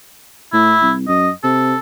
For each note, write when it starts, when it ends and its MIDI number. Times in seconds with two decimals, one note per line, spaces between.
0.53 0.75 45
0.53 0.92 64
0.82 1.04 36
1.08 1.30 42
1.08 1.30 75
1.44 1.75 48
1.44 1.80 69